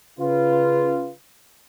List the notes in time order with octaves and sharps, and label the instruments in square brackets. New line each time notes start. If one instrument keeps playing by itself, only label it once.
[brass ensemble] C#3 F4 B4